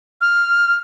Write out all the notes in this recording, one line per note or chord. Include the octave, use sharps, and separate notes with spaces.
F6